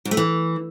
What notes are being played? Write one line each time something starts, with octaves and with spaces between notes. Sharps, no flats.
G#2
A3
E3